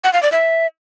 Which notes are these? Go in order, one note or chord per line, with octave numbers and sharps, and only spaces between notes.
F#5
F5
D5
E5